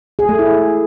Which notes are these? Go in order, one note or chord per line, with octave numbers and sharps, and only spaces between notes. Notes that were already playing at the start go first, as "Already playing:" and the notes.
G#4
A3
E4